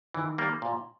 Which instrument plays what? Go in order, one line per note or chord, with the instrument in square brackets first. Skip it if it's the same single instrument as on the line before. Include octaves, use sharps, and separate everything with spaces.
[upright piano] D#3 [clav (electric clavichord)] E3
[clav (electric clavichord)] G3 A#3
A#2